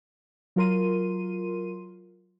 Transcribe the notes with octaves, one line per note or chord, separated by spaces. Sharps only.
F#3 F4 A#4 C6 D#7